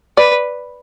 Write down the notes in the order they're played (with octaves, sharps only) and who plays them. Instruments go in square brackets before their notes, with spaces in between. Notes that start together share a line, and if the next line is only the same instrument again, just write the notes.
[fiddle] B4 [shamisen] D5